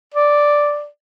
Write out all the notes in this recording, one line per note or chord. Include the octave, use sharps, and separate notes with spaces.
D5